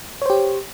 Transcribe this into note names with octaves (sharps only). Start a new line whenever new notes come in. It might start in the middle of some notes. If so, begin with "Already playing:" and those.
G4 C5 C#5